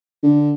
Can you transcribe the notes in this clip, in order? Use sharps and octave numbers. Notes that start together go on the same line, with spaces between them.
D3